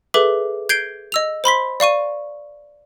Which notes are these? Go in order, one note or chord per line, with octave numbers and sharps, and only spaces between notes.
G#4 A4 B4 E5 D6
G6 G#6 C7 D7 G7
D#5 E6 F7
C5 B5 C6 B6
D5 F5 C#6 D#7